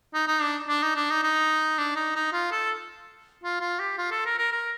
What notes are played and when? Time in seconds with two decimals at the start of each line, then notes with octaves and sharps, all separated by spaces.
0.14 D#4
0.28 D#4
0.42 D4
0.68 D4
0.82 D#4
0.96 D4
1.10 D#4
1.23 D#4
1.79 D4
1.96 D#4
2.16 D#4
2.33 F4
2.52 A4
3.43 F4
3.61 F4
3.80 G4
3.98 F4
4.11 A4
4.26 A#4
4.38 A#4
4.52 A#4